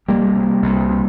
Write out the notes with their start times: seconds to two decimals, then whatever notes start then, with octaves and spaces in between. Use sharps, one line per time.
0.08 C2 G3 A#3
0.35 C3
0.62 C2
0.91 C3